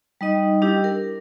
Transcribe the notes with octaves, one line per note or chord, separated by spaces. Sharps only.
G3 D#4 D#5
G3 D4 E4 G4
A#4